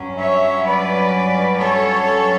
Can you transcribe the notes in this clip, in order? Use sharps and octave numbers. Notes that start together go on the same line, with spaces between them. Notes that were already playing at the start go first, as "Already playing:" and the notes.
Already playing: G2 F#3 C#4
C#5 E5
B4 D5
A4 C#5